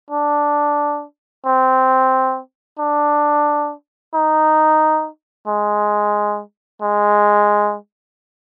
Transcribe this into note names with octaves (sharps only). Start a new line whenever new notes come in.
D4
C4
D4
D#4
G#3
G#3